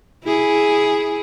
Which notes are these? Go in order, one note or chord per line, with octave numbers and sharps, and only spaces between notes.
E4 G#4